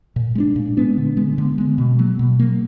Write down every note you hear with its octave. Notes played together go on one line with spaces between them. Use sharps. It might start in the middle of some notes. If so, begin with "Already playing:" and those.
A#2
G#3 B3 D4
A#2
G#3 B3 D4
D3
G#3 B3
D3
G#3 B3
B2
F#3 A#3
B2
F#3 A#3